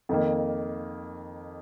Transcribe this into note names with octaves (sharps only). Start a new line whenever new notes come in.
F2 D#3 A#3